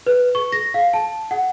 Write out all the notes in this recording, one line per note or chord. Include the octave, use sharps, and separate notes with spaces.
B4
C#6
A#6
F5
A5
F#5